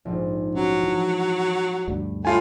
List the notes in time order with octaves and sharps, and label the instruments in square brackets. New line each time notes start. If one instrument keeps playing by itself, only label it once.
[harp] A#1 G#2
[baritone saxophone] F#3 [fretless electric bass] C#4
[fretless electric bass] E3 [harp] A5
[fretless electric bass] D2 G2 G3
[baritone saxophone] A2 [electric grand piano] F4 G#5